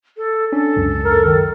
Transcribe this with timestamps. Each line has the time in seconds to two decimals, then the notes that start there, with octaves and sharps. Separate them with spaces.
0.17 A4
0.52 C#4 D4 A4
0.76 C#2 F#2
1.04 A#4
1.24 D#3